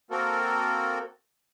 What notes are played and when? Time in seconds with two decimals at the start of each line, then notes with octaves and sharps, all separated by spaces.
0.11 A#3 C4 F#4 A4 A#4